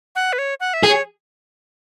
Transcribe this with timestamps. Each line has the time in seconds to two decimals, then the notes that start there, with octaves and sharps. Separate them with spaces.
0.15 F#5
0.33 B4
0.38 C#5
0.60 F#5
0.74 E5
0.83 G#4
0.88 C#5